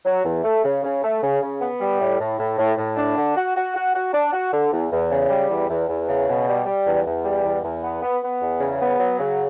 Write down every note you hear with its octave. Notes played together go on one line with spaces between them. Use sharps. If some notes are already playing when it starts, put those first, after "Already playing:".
F#3
E2
A3
C#3
C#3
A3
C#3
C#3
B3
G3
A2
A2
A2
A2
A2
D4
D3
F#4
F#4
F#4
F#4
D4
F#4
D3
E2
E2
C#3
G3
E2
E2
E2
C#3
B2
G3
G3
E2
E2
G3
E2
E2
B3
B3
B3
E2
C#3
B3
F#3
C#3